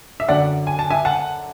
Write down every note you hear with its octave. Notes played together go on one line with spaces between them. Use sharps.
E5
F#2 D3 F#3 D5 F#5
G#5
A5
E5 G#5
F#5 A5